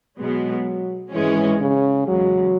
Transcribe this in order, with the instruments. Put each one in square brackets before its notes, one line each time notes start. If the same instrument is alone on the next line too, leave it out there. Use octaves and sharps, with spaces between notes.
[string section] B2 G#3 B3 [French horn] F#3
[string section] G#1 G#2 G#3 C#4 [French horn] E3
[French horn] C#3
[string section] E2 C#3 G#3 [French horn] F#3